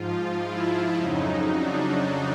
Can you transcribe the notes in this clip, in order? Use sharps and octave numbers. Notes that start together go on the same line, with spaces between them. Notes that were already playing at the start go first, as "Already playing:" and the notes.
Already playing: G#2 F3 F4
E4
F2 C#3 F#3 D#4
D4